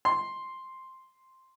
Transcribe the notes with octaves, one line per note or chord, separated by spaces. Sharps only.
C6